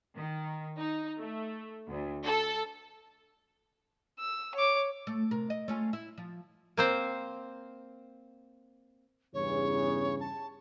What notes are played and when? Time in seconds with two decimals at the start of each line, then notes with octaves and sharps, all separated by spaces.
0.15 D#3
0.79 D#4
1.20 A3
1.87 D2
2.24 A4
4.20 E6
4.55 C#5 D6
5.07 A3
5.31 C3 A#4
5.50 D#5
5.68 A3 C#4 F4
5.93 E4
6.18 F3
6.77 A#3 C4 C5
9.34 E2 G2 C#3 C#5
10.20 A5